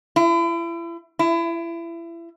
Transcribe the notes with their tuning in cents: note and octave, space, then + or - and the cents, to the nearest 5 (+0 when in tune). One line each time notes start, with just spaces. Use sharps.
E4 +35
E4 +30